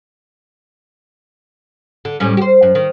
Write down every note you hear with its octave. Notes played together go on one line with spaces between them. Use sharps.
D3
A2 G3 C#4
G4 C5
F#2
D#3